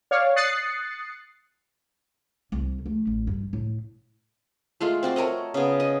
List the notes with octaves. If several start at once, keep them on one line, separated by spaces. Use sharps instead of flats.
C#5 D5 F5
D#6 F#6 A6 C7 C#7
C2
A3
A1
G2
A2
G#3 A3 F4
C4 F#4 D5
A3 A#4 C#5 D#5
C#3 B3
D#5